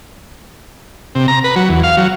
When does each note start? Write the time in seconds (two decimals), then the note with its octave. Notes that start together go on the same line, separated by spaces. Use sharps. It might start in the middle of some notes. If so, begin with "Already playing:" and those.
1.15 C3
1.28 A#5
1.44 B4
1.56 F#3
1.69 E2
1.83 F5
1.97 F#3